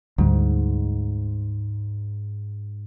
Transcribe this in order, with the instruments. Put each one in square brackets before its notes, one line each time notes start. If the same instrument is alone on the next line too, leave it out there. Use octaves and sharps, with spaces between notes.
[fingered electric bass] D2 G3 [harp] G#2